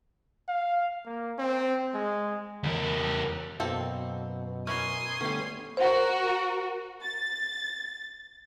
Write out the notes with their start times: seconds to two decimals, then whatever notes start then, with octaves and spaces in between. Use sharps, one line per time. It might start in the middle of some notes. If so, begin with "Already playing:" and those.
0.48 F5
1.06 A#3
1.38 C4
1.94 G#3
2.64 E2 A#4
3.60 F#2 B2 A#3 C4 A4
4.67 E3 C#4 A#4 G#5 C6 D#6
5.21 D3 G3 A3 B3 C#4
5.77 F#4 A#4 C5 F#5
7.02 A6